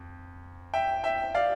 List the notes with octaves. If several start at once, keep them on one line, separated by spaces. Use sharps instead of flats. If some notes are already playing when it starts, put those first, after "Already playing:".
Already playing: F2
E5 G5
E5 G5
D5 F5